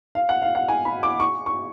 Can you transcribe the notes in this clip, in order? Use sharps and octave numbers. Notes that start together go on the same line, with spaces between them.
F5
F#5
F5
F#5
G#5
B5
D6
C#6
C#6